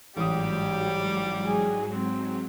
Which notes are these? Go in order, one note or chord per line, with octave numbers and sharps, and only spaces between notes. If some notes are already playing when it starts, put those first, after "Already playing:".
A1 G#2 F#3 G3 G4 D#6
G#4
C4